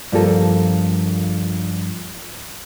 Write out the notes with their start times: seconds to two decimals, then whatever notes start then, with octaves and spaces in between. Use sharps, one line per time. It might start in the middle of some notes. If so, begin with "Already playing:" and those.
0.12 G2 F3 A#3 A4